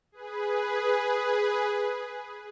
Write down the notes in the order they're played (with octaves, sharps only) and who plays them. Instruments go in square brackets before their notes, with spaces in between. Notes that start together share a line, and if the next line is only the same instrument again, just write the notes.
[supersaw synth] G#4 B4